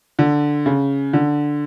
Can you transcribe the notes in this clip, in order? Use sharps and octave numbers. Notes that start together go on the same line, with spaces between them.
D3
C#3
D3